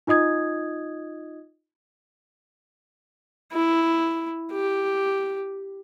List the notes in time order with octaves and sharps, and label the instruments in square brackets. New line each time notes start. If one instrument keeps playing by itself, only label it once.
[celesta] D#4 F4 D#5 D#6 G#6
[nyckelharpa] E4
G4